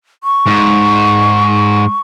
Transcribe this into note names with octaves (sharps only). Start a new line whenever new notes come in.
C#6
G#2